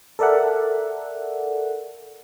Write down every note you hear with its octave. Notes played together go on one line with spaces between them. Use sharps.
A4 A#4 D5 E5 F#5